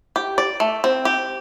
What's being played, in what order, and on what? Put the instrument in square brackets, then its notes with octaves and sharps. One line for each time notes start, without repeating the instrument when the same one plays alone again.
[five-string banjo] G4
D5
A3
C4
G4